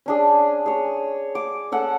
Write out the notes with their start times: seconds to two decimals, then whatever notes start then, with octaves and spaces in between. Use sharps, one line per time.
0.06 C#4 D4 G#4
0.66 G#4 C#5
1.35 D6
1.72 C#4 A4 F#5